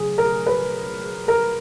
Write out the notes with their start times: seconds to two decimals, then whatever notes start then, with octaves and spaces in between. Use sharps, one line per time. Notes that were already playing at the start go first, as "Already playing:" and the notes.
Already playing: C#3 F#3 G#4
0.18 A#4
0.47 B4
1.28 A#4